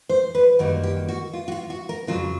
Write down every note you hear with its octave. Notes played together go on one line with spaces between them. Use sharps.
C5
B4
F#2 D#3 G3 A#3
G4
F#4
F4
F#4
F4
F#4
A#4
F2 C#3 F#3 F4